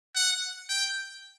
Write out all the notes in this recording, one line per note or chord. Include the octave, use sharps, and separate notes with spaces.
F#5
G5